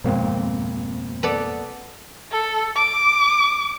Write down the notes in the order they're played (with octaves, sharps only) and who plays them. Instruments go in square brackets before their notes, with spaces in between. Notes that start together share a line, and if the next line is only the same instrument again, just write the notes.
[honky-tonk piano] G#1 [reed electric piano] F2 A#3 C4 [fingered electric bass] B2
[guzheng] B3 A4 D5
[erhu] A4
D6